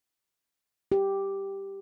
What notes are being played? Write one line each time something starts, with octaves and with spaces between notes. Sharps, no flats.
G4